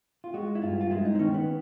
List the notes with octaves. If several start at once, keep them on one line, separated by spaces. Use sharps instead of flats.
F4
G#3 F#4
E4
G2 F4
F4
G#3 E4
D#4
C4
D#3 C#4
B3